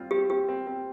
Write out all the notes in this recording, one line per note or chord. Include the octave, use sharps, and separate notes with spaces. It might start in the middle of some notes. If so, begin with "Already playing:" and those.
Already playing: G3 C4 F4
C4 G4
C4 G4
C4
C4